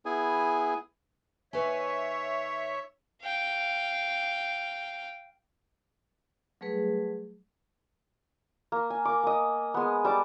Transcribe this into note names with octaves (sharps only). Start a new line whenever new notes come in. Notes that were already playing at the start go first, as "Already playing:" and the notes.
B3 E4 G#4 G#5
D#2 B4 C#5 E5 G#5
F5 G5
F#3 G3 A3 G#4 B4
A#3
G#5
A#3 D6
A#3 D#5
G#3 B3
G3 A5 D6